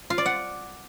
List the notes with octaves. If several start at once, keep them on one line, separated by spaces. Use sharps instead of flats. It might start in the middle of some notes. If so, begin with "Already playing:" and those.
F4
D5
F#5